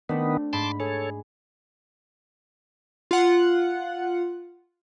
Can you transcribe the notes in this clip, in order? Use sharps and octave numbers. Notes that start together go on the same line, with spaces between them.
D#3 A3 B3 C4 D4
G#2 A5 B5 C6 D6
G#4 A4 C#5
F4 F#5